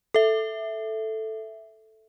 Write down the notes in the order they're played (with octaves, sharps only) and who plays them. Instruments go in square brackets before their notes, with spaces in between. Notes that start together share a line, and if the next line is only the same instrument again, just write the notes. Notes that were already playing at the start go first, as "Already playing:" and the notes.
[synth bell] A4 E5